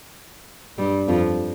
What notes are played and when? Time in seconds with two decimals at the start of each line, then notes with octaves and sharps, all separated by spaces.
0.78 G2 G3
1.08 F2 F3